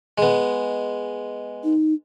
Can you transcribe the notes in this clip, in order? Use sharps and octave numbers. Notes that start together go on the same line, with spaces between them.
G#3 B3
D#4